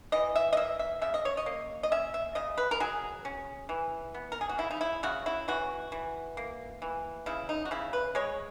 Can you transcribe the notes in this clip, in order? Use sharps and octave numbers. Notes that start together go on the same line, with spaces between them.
E3 D#5
E5
D#5
A#3 E5
E5
C#3 E5
D#5
C#5
D#5
A#3
D#5
C#4 E5
E5
C#3 D#5
B4
A#4
F#3 G#4
C#4
E3
B3
A#4
G#4
F#4
C#3 E4
D#4
E4
C#3 F#4
E4
E3 F#4
E3
A#3
E3
C#3 E4
D#4
F#4
C#3 E4
B4
G#3 C#5